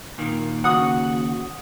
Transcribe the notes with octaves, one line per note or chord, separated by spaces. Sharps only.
A#2 D#3 A#3
D#2 C#3 F#4 F#5 D#6